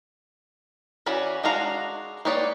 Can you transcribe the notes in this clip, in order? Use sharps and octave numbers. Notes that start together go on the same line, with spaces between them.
E3 C#4 F#4 D5 B5
G#3 D4 F#4 F5 A#5
A#3 D#4 B4 C#5 D5